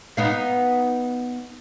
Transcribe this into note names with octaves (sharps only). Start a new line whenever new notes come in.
B3 D#4 F5